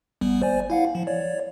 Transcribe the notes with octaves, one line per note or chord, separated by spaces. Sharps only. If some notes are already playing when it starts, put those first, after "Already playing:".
G1 G3 B3
C5 D5 G#5
E4 F5 F#5
F3
C#5 D5